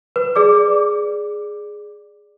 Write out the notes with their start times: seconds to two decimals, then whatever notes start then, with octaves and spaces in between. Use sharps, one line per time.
0.16 B4
0.36 G#4 D5 D6